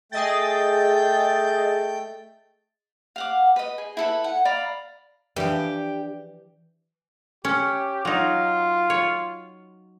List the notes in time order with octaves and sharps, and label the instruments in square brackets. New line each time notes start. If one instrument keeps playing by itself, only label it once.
[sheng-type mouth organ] A3 G5 G6 [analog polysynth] G#4 D#5 A6
[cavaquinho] F5 F#5 D6
B4 D#5
G#4
E4 A4 B4
F#5
D5 F5 A#5 B5
[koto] E3 F3 [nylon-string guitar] D4 B4 [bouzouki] G4
[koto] C#4 [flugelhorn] G4
[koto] F#3 D#4 [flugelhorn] F4
[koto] C#5